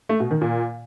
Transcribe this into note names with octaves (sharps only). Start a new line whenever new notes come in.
A3
B2
D#3
A#2